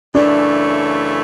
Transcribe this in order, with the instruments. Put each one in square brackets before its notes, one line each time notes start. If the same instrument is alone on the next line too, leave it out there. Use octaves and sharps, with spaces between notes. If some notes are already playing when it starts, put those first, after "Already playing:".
[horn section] F#2 C#3 E3 A3 [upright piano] D4